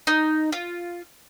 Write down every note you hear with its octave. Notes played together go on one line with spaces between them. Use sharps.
D#4
F4